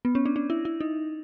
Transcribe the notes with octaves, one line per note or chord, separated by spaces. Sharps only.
B3
C#4
D4
D4
E4
E4
D#4